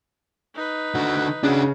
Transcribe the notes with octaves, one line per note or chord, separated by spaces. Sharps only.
D#4 B4
D3 F#4
C#3 D4 F#4